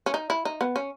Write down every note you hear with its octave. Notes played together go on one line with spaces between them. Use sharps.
C#4
D#4
E4
D#4
B3
C#4